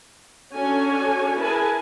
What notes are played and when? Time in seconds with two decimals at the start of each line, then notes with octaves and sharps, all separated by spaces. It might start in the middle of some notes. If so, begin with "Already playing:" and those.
0.55 C#4 D4 F#4 A4 C#5 G#5
1.40 E4 G#4 A#4 B4 G#5 A5